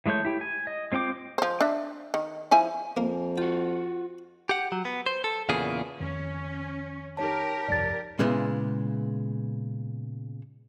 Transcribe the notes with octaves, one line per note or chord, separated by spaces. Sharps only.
E3 G#3 A3 C#5 G6
E4 G4
G#5
D#5
G#3 C4 F4 G5 D6
F3 C5
D4 E5
D#3
F3 E4 G#5
F2 A#3 A#4
F4 F#4 G5
G4 F#5
F#3
B3
C5
A4
E2 A#2 C#3 A#3 B3 G#4
F2 D#3 C#4
D#4 G4 A#4 C#5 A5
G1 C2 F2 D5 A6
A#2 C#3 G#3 B3 E4